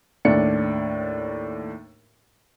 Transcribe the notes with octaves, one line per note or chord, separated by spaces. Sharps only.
D#2 A2 D4 C#7